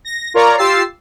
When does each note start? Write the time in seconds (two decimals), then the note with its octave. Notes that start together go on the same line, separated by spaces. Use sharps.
0.05 A#6
0.34 F4 A#4 C#5 D5 A#5
0.58 F4 G4 E6 A6 C7